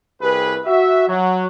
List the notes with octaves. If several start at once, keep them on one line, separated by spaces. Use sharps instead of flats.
C2 G4 G#4 B4
F#4 E5
F#3